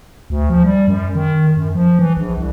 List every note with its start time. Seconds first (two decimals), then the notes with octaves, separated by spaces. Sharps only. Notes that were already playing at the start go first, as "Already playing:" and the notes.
0.30 D2
0.50 F3
0.64 G3
0.88 F#2
1.15 D#3
1.57 F#2
1.75 F3
1.99 E3
2.17 A#1
2.38 C2